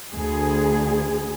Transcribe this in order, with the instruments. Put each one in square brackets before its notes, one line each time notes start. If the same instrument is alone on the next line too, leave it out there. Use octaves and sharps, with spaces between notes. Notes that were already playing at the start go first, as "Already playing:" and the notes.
[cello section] D2 G#4